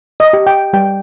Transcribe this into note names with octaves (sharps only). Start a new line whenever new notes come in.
D#5
G4
G5
G3 G5